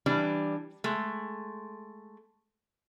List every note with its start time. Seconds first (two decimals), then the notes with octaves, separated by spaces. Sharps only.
0.06 E3 G3 D4
0.84 G#3 A3